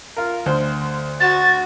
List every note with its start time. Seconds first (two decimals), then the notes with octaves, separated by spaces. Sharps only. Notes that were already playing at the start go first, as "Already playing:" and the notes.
0.17 F4 A#4
0.46 D2 C5
1.20 F#4 A6